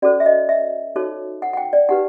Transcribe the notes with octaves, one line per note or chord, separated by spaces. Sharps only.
C#4 F#4 A4 C5 D5
E5
D#5
E5
D#4 F#4 A4 C#5
F#5
F#5
G5
D5
D#4 G4 B4 F#5